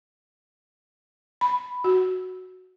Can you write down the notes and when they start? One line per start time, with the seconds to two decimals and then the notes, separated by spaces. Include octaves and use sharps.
1.41 B5
1.84 F#4